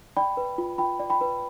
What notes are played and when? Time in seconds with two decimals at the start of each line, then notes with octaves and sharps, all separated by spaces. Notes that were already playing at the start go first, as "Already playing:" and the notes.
0.17 D5 G5 B5
0.37 B4
0.58 F4
0.78 F4 G5 B5
0.99 D5
1.10 G5 B5
1.21 B4